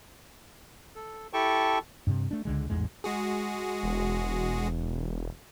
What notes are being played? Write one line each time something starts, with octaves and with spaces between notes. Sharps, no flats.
A4
E4 G4 A4 G5 A5 C#6
G2 C3
A3 D4
C#2 D3 G#3
A1 E2 G#2 G#3
G#3 F#4 G#4
E1